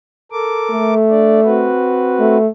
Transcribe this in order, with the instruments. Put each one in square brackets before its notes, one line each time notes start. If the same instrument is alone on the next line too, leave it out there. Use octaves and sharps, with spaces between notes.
[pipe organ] A4 A#4 D6
[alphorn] A3
[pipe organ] D4 D5
C4 F#4 B4
[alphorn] A3